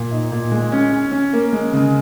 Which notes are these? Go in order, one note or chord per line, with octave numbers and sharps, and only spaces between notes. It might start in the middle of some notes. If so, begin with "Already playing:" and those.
Already playing: A#2
D#4
A#2
G#3
C#4
C#4
C#4
A#3
G#3
C#3